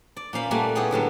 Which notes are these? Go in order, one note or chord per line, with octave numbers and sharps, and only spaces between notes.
D5
A#2 A#3 C#4 C5 F5 B5
A#2 G3 A3 A#3 F#5 G#5
B3 E4 G4 G#4 C#5
A2 D3 F#3 G3